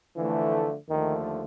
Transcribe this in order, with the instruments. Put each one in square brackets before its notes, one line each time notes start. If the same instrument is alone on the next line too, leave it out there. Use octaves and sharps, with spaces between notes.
[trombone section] D3 F3 A3 [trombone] E3
[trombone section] D#2 D3 F3 A3 [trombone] D#3